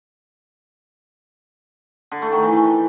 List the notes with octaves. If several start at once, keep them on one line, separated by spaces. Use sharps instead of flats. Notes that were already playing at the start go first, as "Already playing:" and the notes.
D3
A3
D#3
E3